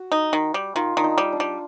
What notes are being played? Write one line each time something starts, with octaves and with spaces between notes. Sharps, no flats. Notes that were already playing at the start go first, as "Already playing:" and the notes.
Already playing: F#4
D#4
D#3
G3
D#3 F4
D#3 D4
D#4
G3
D4
G3